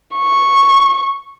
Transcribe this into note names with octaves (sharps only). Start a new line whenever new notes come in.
C#6